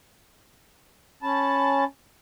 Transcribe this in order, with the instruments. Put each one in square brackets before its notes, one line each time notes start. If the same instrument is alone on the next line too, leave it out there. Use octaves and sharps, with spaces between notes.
[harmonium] C#4 A5 [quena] B5